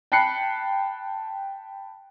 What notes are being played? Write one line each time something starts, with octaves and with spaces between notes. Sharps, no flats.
G5 A5 B5 F#6 C7 C#7